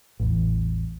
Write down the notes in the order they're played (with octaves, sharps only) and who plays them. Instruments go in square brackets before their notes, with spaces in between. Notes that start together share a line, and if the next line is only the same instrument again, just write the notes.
[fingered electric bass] A1 E2